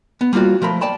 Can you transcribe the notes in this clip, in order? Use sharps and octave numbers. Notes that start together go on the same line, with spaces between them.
B3
G3 A#3 C4 F4 F#4
F3 A3 A#4 B5
D5 G5 A5 B5